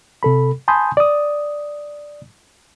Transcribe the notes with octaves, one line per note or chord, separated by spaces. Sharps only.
C3 A4 B5
G#5 A5 B5 C6 D#6 G6
D5 D#6